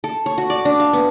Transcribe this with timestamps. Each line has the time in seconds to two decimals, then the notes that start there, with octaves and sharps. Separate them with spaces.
0.04 A4
0.26 C#5
0.38 F#4
0.50 D5
0.65 D4
0.80 F5
0.93 B3